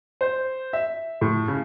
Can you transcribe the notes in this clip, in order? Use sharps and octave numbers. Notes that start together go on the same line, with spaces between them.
C5
E5
A2
C#3